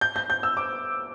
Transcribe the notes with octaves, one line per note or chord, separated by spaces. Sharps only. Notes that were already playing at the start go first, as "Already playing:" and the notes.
G6
G6
G6
E6
D6